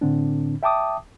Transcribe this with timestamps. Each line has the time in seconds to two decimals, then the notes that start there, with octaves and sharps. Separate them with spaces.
0.01 A2 D3 C4 D4
0.63 E5 G5 A5 D6 D#6